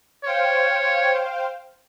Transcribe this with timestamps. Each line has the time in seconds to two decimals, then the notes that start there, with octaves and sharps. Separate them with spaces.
0.24 C5 C#5 F5 G5